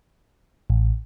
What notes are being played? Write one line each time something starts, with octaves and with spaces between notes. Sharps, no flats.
A1